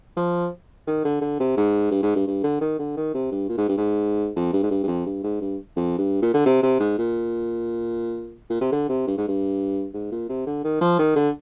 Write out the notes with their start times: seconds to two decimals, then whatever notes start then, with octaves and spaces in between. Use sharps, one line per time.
0.17 F3
0.87 D#3
1.05 D3
1.21 D3
1.40 C3
1.57 G#2
1.91 G2
2.03 G#2
2.15 G2
2.27 G2
2.43 D3
2.61 D#3
2.79 D3
2.97 D#3
3.14 C3
3.31 G2
3.49 A#2
3.58 G#2
3.68 G2
3.77 G#2
4.36 F2
4.53 G2
4.63 G#2
4.71 G2
4.84 G2
4.88 F2
5.06 G2
5.23 G#2
5.41 G2
5.76 F2
5.98 G2
6.22 A#2
6.34 D3
6.46 C3
6.63 C3
6.80 G#2
6.98 A#2
8.50 A#2
8.61 C3
8.72 D3
8.89 C3
9.07 G2
9.18 G#2
9.28 G2
9.94 G#2
10.11 A#2
10.29 C3
10.47 D3
10.64 D#3
10.81 F3
10.99 D#3
11.16 D3